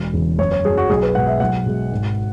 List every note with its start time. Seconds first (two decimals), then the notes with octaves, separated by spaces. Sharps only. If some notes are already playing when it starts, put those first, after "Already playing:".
Already playing: E1
0.13 E2 C#3 E3
0.38 F#1 C#5
0.52 C#5
0.65 F#2 F#3 G#4
0.78 F#4
0.90 B1 G#4
1.02 B4
1.15 B2 G#3 F#5
1.27 E5
1.40 B1 F#5
1.66 B2 G#3
1.91 G#1